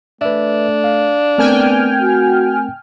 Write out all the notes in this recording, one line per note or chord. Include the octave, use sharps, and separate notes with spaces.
A3 D4 B4 E5
F5
A3 B3 C4 A#4 G5 G#5 F6
F#4